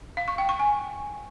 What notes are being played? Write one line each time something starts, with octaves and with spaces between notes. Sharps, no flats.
F5
C#6
G5
C#6
G#5